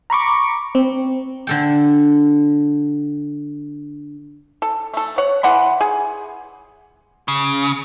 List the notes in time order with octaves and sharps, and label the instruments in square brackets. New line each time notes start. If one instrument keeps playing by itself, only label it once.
[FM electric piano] A#5 B5 C#6 D6
C4
[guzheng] D3 A4 G5
[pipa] A4
A3 A4
C#5 F#5
E3 F#5 B5 C6
G#4
[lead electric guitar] C#3